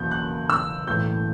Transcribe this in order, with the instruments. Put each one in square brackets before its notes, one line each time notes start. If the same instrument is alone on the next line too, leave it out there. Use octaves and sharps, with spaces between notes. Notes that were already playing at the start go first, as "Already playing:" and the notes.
Already playing: [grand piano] F#1 E2 B2 F#3 G6
F#6
E6
B1 A2 E3 G6